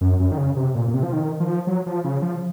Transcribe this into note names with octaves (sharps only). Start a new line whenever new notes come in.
F#2
F#2
D#3
C#3
C3
A#2
A#2
C3
F3
D#3
F3
F#3
F3
C#3
F3